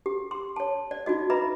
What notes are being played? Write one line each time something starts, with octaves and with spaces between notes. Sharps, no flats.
G4
C6
C#5 A5
D5
D#4 F4 F#4 D#5
B4 D#5 E5 A#5 B5